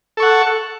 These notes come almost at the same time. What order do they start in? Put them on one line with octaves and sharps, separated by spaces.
A4 C#6 F#5